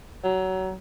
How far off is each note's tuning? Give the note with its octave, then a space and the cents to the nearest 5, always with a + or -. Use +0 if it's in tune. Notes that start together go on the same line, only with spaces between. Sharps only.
F#3 +25